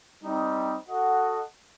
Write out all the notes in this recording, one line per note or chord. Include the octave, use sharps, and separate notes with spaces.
G3 C4 D#4
F#4 A4 D#5 F#5